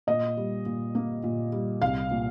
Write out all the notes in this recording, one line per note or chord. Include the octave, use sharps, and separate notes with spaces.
A#2 D#5
G3
A#2
A#3
A#2
G3
C2 F5
A#2